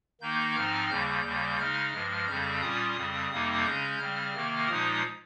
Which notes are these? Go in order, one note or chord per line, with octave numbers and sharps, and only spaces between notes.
D#3 A#3 D#4 G6
G#2 F3 C4 D#4 F6
D#2 C#3 G3 G6
D#2 C#3 G3
C#3 G#3 D#4 F6
G2 F3 G#3
F2 C#3 G3 C4 G6
A#2 G3 C#4 F4 D#6
F2 C#3 G3 C4
F2 C3 G3 A#3 D#4
C#3 G#3 C#4 G6
C#3 G3 C4 F6
C3 D#3 A#3
A#2 F3 G#3 D#4 D#6